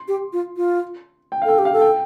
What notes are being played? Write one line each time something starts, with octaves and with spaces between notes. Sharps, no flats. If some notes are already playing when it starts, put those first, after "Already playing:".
Already playing: C6
G4
F4
F4
G5
F5
A4 G5
G4
F5
A4
G5